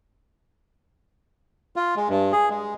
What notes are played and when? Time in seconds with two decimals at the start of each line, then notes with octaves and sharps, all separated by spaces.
1.76 F4
1.97 G#3
2.09 G2
2.33 G#4
2.50 G#3